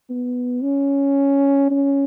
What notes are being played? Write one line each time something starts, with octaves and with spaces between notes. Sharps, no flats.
B3
C#4
C#4